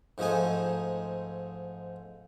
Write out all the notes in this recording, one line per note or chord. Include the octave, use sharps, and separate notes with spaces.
G#2 F3 A3 D#4 G#5